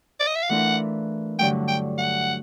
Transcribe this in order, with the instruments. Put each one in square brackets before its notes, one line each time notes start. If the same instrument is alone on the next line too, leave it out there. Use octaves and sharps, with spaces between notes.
[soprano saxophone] D5
D#5
E5
F5
[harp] E3 A3 D4 F4 A#4 [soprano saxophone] F#5
[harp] G2 D3 F#3 A3 [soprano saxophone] G5
[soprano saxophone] G5
F#5